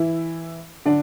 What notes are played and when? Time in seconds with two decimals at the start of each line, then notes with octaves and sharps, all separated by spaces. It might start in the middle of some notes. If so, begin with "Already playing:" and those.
Already playing: E3 E4
0.85 D3 D4